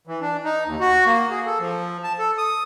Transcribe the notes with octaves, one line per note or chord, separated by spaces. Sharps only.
E3
D4
D#4
D#2
F#4
A#3
G#4
A4
F3
A5
A4
D#6